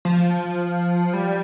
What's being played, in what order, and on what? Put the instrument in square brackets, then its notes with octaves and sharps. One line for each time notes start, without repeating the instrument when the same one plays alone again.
[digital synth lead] F3
G3